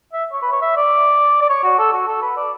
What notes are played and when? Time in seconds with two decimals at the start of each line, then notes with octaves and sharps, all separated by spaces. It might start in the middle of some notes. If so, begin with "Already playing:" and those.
0.13 E5
0.32 C#5
0.42 B4
0.52 C#5
0.62 E5
0.76 D5
1.41 D5
1.49 C#5
1.64 F#4
1.79 A4
1.93 F#4
2.08 A4
2.22 B4
2.36 D5